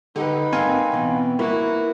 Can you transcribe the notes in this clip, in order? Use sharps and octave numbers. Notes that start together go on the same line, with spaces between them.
D3 D#4 G4 B4 F#5
G#2 A#3 C4 F5 G#5 C6
B2 E3 B3
A#3 E4 F#4 A#4 B4